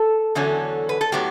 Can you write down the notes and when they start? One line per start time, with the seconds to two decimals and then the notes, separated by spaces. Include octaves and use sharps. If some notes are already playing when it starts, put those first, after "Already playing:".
Already playing: A4
0.35 E2 D3 F#3 C#4
0.89 B4
1.01 A4
1.12 A2 F#3 B3 G4